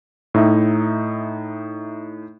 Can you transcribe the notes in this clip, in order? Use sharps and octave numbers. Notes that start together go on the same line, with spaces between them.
A2 D#4 E5